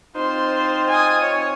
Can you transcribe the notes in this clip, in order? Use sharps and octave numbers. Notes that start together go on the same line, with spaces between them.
C4 D#4 F4 C5
G#5 D#6
C#5